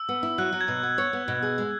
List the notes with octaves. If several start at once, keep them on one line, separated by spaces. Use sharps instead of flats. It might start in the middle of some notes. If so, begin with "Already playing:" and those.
Already playing: E6
B3
E4
F#3 F#6
F#3
G#6
B2
B3
C#5
B3
B2
G#4
G#3